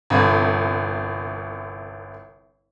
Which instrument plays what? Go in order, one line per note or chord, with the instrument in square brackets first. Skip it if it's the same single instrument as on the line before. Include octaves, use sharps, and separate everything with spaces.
[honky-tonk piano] G1 C2